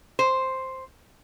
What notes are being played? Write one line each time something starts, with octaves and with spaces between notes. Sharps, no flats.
C5